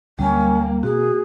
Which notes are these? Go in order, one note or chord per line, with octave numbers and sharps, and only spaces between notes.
D2 D3 F#3 G3 A#3 C#4
B2 C4 F#4 G#4